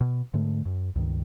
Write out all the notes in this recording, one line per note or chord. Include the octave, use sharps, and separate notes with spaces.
B2
G#2 D3 A3
F#2
C#2 G2 D#3